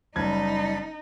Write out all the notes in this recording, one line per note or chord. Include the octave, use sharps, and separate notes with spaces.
F#1 G3 D#4 A5 B5 G#6